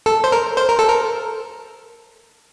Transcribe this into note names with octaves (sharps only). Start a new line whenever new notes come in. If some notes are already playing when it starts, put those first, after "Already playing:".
A4
C5
A#4
C5
A#4
A4
A#4